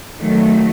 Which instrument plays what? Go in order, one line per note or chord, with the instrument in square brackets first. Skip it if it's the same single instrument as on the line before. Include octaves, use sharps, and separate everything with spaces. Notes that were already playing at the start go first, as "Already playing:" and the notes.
[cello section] D#3 F#3 A3